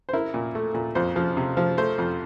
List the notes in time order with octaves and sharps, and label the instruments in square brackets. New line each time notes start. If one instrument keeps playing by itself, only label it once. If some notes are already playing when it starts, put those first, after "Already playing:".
[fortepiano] C5
E4 A#4
A#2
A3
A#2
F2 C5
F3
C3
F3
A3 C5
F2